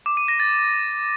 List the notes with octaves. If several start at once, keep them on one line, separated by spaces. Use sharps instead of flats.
D6
D#7
A#6
A6